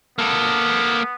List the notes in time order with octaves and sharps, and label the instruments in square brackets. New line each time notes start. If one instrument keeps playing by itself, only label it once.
[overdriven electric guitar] A#3 A4 [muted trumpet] B3